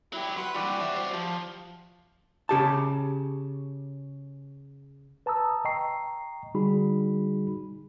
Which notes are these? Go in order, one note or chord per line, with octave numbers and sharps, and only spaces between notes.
F#3 E4 G4
B4 F#5 C6 C#6
G2 E3 F#4 G4 D5
C5 E5
G3 C5
F3
C#3 G4 A5
B4 A5 A#5 D#6 E6
D#5 G5 A#5 C#6 C7
D3 G3 D#4 F#4 G#4 B5